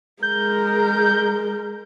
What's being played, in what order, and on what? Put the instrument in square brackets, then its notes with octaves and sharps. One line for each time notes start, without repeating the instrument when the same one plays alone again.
[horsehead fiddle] G#3 A#4 [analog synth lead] G6